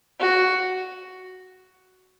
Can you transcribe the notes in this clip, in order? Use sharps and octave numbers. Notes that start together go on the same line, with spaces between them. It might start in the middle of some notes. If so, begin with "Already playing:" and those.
F#4